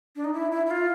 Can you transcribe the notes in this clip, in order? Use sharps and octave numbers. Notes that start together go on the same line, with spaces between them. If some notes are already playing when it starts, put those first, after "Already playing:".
D4
D#4
E4
E4
E4
F4